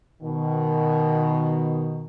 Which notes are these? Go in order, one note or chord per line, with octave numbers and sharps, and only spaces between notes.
B2 D#3